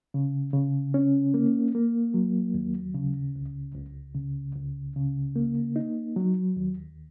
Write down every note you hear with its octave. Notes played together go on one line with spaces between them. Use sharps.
C#3
C#3
C#4
A#3
A#3
F#3
D#2
C#3
C#2
C#2
C#3
C#2
C#3
A#3
D#4
F#3
D#2